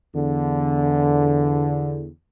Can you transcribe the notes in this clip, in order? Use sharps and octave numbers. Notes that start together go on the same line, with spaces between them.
E2 D3